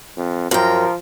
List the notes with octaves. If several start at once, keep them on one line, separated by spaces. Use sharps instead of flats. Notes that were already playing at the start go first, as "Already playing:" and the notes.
F2
F#2 F3 A#4 G5